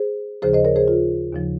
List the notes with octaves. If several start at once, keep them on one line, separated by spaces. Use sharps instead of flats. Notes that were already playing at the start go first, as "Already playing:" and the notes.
Already playing: G#4 C5
D#2 C#3 F3 G#4 C5
C5 D#5
A#4 C#5
G#4 C5
F4
D#2 C#3 F3